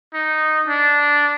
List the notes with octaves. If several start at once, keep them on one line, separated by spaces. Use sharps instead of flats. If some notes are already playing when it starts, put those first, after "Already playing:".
D#4
D4